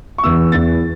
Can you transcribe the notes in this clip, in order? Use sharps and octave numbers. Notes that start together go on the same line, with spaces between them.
C#6
E2 E3 B3 E6
E2 E3 B3 A6